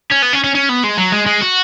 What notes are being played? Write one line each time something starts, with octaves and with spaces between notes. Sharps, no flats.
C#4
B3
C#4
C#4
C#4
B3
G#3
F#3
G#3
G#3
F#4